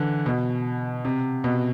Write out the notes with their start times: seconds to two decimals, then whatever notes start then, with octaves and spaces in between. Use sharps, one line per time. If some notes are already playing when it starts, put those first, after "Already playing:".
Already playing: D3 E3
0.26 B2
1.05 C3
1.44 B2